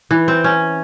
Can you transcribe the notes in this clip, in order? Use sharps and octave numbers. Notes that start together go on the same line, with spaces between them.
E3
C4
C#4